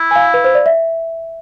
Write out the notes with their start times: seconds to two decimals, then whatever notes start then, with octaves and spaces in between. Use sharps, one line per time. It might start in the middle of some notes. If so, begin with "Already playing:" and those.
Already playing: E4
0.11 G#5
0.16 F5
0.34 B4
0.44 C5
0.55 D5
0.66 E5